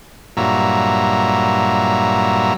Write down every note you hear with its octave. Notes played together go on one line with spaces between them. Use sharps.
G2 A#2 F#3 E5 A#5